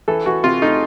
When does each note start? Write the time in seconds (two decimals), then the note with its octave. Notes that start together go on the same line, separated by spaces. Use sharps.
0.08 E3 A4
0.26 E3 F#4
0.44 C3 F4
0.62 A3 D#4